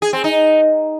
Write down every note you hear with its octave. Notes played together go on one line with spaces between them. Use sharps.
G#4
C4
D#4